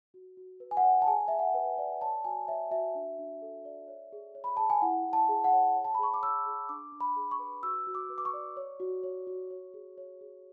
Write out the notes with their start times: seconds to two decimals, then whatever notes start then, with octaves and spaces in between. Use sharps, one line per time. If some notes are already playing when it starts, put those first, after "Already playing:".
0.14 F#4
0.37 F#4
0.60 B4
0.71 G#5
0.77 F#5
0.84 D5
1.02 A5
1.07 G#4 G#5
1.28 G#4 E5
1.39 F#5
1.54 B4
1.78 D5
2.01 C#5 A5
2.24 F#4 G#5
2.48 C#5 E5
2.71 F#4 E5
2.95 D4
3.19 D4
3.42 A4
3.65 D5
3.88 C#5
4.12 G#4
4.35 C#5
4.44 B5
4.57 G#4 A5
4.70 G#5
4.82 E4 F#5
5.05 E4
5.13 A5
5.29 G#4
5.44 F#5
5.53 C#5
5.76 C#5
5.85 A5
5.94 B5
5.99 G#4 C#6
6.14 D6
6.22 C#5 E6
6.46 G#4
6.69 D4 D6
6.92 D4
7.00 B5
7.16 G#4
7.31 C#6
7.39 B4
7.63 F#4 E6
7.87 F#4
7.95 D6
8.09 B4
8.18 D6
8.25 C#6
8.34 D5
8.57 C#5
8.80 F#4
9.03 C#5
9.27 F#4
9.51 C#5
9.74 G#4
9.98 C#5
10.21 G#4